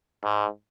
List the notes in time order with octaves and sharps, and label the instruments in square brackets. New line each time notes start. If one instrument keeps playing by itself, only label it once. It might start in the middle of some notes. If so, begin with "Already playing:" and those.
[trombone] G#2